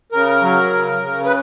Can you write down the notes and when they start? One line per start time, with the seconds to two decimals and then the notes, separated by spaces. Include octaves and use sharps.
0.12 C#3 A#4
0.42 F#3
0.73 C#3
1.02 C#3
1.25 B4